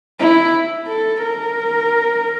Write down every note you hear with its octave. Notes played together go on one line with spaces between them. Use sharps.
E4
A4
A#4